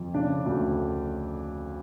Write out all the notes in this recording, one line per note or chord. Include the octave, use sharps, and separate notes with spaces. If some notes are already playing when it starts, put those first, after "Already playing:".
Already playing: F2
C#3 D4
D2